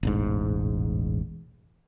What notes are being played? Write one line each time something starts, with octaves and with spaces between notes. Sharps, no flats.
E1 A1 G#2